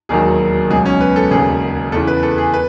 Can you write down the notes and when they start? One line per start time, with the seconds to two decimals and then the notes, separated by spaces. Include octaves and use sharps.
0.09 E1 D#2 D#3 F#3 G#4
0.70 C#2 B2 F#3 G#4
0.85 C#4
1.01 B4
1.16 A4
1.31 E1 D#2 C#3 G#4
1.92 E2 C#3 E3 A4
2.07 B4
2.23 A4
2.38 G#4
2.53 B4